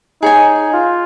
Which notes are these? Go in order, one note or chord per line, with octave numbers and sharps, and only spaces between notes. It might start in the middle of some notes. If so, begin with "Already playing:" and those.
D#4 G#4 C#5 G#5
F4